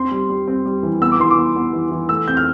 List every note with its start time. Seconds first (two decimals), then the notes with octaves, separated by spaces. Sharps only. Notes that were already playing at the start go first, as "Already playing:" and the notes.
Already playing: C4 C6
0.11 G3
0.29 G3
0.48 C4
0.66 G3
0.83 E3
1.02 B3 E6
1.12 D6
1.20 E3 C6
1.31 D6
1.37 B3
1.56 B3
1.73 E3
1.91 E3
2.09 A3 E6
2.28 C4 G6
2.37 F6